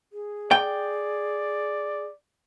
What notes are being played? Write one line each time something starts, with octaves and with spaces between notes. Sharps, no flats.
G#4
D5 G5